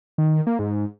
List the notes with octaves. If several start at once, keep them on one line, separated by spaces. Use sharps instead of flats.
D#3
A#3
G#2